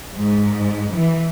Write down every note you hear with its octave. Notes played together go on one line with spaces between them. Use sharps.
G#2
E3